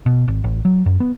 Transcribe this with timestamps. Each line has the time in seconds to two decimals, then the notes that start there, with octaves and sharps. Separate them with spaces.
0.06 B2
0.28 G#1
0.44 A1
0.65 F#3
0.86 F#2
1.00 B3